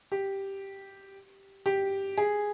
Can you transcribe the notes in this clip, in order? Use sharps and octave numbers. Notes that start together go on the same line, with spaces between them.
G4
G4
G#4